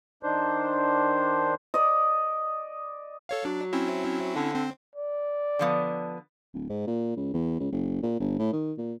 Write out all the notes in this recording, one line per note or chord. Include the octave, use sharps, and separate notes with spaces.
D#3 D4 C5
D5 D#5
A4 C#5 F5
F#3 D4
C4 C#4 E4
D3
C4
D5
D3 F3 B3
D1
G#2
A#2
C#2
E2
C#2
F#1
A#2
G1
A2
D#3
A#2